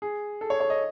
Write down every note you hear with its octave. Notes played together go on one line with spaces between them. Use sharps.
G#4
A4
C#5
C#5
D#5